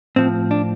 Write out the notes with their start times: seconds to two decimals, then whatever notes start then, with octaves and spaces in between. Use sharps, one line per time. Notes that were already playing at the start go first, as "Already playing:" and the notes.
0.16 A2 F3 C4
0.51 D4